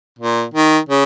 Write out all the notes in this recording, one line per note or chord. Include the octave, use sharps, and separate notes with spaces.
A#2
D#3
C#3